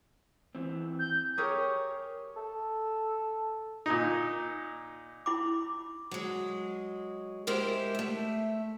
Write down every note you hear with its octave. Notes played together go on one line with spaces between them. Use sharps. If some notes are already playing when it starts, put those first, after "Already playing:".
E3 C4
G6
G4 G#4 A#4 C#5
A4
A#2 D#4
E4 B5 D6
F#3 G#3
G#3 E4 G4 A#4 C5
A3 E5